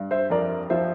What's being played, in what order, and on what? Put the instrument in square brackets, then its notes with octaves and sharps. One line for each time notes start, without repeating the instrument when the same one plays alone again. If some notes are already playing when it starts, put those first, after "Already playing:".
Already playing: [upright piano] G2
[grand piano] C5 E5
[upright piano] F2 [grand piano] A#4 D5
[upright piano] F3 [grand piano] C5 E5